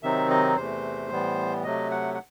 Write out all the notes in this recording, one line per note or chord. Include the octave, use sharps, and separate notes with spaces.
C3 D#3 F#3 C4 D#4 E5
D#5
E2 C3 E3 A3 C5
A2 E3 G3 B3
C3 F#3 A3 D#5
F#5
F#5